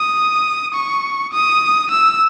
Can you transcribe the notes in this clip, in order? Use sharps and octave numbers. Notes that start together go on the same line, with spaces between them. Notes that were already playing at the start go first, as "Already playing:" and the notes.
Already playing: D#6
C#6
D#6
E6